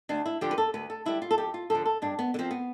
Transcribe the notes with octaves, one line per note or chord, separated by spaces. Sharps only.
D2 D4
E4
D3 F3 G4
B4
A4
D2 B4
A4
D3 G3 E4
F4
A4
F2 G4
F4
D3 F3 A4
A4
G2 D4
B3
D3
F3 C4
B3